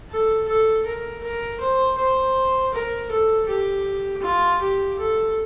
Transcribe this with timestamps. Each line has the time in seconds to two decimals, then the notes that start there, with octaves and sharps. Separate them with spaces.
0.10 A4
0.48 A4
0.86 A#4
1.23 A#4
1.61 C5
1.98 C5
2.74 A#4
3.11 A4
3.49 G4
4.23 F4
4.61 G4
4.99 A4